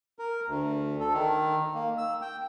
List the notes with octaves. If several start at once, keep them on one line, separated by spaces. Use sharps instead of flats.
A#4
D2
A4
D#3
A#3
E6
G5